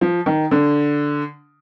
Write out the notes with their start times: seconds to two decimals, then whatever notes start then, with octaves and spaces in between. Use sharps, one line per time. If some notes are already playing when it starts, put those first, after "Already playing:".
0.01 F3
0.26 D#3
0.51 D3